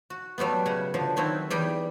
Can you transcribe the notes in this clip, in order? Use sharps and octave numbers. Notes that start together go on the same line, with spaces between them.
F#4
F#3 G3 A3 B3
C#3 F#5
D3 F3 F#3
D#3 F#3 C4 D#4 E4
E2 G3 D#4 G5 B5